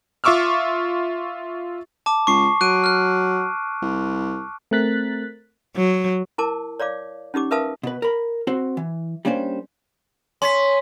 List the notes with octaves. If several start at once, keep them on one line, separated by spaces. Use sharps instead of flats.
F4 E5 C#6 D6 E6 F6
A5 D6
C#2 C#6 C7
F#3 F#6 D7 D#7
F6 F#6
C2
A3 C4 A#4 F#6 A6 B6
F#3
E4 A#4 A5 D6
C#5 D5 F5 D6
C#4 D#4 G4 D6
A#4 B4 E5 F5 A5 D#6
B2 B4
A#4 B5
C4 F#4 C5
E3
G3 A#3 C#4 D4 C5
C#4 C6 B6